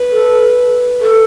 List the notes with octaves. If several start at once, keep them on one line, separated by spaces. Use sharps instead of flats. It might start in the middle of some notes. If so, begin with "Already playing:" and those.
Already playing: B4
A4
A4